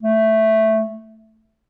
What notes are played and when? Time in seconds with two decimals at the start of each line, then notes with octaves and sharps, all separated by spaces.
0.03 A3